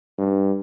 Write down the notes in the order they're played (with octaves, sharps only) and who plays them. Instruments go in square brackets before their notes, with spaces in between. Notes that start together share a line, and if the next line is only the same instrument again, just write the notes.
[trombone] G2